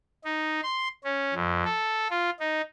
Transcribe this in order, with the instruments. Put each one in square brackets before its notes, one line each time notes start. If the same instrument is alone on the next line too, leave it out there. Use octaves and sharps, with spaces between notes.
[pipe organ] D#4
C6
C#4
F2
A4
F4
D#4